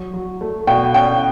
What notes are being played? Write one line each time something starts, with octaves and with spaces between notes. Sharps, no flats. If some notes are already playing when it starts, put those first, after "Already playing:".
Already playing: F#3
F#3
A3
B2 G5
C#4 G5